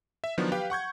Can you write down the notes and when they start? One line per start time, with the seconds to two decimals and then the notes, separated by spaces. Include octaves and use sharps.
0.24 E5
0.38 D#3 F3 F#3 B3 D4
0.52 G4 B4 F5 G5
0.70 F#5 C#6 G6 G#6